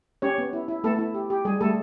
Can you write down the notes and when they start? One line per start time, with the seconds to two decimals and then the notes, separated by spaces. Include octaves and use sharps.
0.22 C#4 G4 C#5
0.38 B3
0.53 E4
0.68 E4
0.84 A3 B3 A4
0.99 E4
1.14 G4
1.30 G4
1.45 G3 G#4
1.61 G3 A3 A4